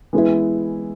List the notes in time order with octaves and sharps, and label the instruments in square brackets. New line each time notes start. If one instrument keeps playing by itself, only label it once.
[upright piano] E3 G#3 B3 E4